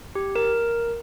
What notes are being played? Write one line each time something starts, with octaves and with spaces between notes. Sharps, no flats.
G4
A#4